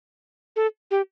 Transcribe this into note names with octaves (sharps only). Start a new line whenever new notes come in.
A4
G4